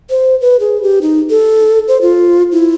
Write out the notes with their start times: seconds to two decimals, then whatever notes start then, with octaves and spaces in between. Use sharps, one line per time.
0.10 C5
0.41 B4
0.60 G#4
0.82 G4
1.02 D#4
1.30 A4
1.88 C5
2.02 F4
2.52 E4